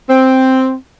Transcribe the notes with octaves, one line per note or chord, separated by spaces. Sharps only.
C4